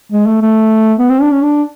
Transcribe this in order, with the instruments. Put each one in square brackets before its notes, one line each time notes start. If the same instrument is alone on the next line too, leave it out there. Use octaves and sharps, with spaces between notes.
[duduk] G#3
A3
A3
B3
C4
D4
C#4
D4